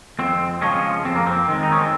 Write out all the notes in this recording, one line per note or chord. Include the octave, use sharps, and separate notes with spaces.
F2 C4
C#3 F3 G#3 C#4
F2 C4
A#3
C4
D#3 G#3
D#4
C#4
C4